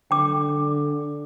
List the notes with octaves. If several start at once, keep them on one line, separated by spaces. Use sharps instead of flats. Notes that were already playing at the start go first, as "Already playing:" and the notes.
D3 G5 D6